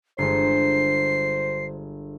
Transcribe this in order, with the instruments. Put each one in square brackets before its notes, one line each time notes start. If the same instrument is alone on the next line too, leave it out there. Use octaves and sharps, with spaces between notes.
[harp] G1 G#3 [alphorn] C5 [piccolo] C7